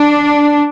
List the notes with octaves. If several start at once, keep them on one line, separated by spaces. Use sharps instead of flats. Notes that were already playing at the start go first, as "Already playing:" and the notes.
Already playing: D4